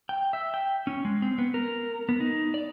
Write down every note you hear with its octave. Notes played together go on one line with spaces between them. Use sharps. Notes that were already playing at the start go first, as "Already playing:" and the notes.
G5
E5
G5
C#4
G#3
C4
B3
A#4
B3
D#4
D5